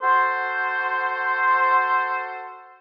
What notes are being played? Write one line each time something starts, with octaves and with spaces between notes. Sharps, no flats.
F#4 A4 C5